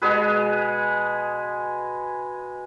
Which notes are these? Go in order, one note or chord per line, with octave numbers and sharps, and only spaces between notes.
B2 G#3 G#4 B4